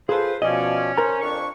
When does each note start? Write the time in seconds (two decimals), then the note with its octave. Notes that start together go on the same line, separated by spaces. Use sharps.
0.09 F4 G#4 A4 B4 C5
0.42 B2 F3 C#4 D5 D#5
0.98 A#4 C5 A#5
1.22 F2 D4 C#6